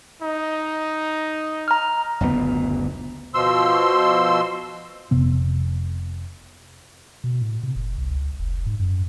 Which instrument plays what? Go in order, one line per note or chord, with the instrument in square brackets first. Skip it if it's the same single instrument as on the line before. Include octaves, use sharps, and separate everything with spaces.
[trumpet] D#4
[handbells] A#5 F6
[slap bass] F#1 D2 A#2 B3
[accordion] B2 F3 C6 E6
[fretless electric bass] F1 C3 B3
[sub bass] B2
A2
C3
F#1
C2
C#2
F1
G#2
F#2